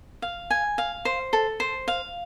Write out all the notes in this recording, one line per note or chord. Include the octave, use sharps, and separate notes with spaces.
F5
G#5
F5
C5
A4
C5
F5